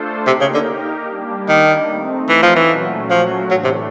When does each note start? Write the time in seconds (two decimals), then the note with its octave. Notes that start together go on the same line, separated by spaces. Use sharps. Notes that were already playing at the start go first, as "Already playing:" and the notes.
Already playing: A3 D4 F4 A4 C5
0.27 C3 A#3 D#4 G4 A#4
0.41 C#3
0.54 D3
1.08 G3 A#3 D4 G4
1.49 D#3
1.89 A3 C4 D#4
2.29 E3
2.43 F3
2.56 E3
2.70 A#2 F#3 A3 C#4 F#4
3.10 F3
3.50 A2 E3 F#3 A3 D4
3.64 C3